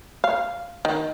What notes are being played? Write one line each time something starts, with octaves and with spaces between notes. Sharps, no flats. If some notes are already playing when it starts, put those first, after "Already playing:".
F5
D#3